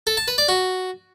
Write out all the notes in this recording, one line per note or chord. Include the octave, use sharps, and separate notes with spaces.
A4
A5
B4
D5
F#4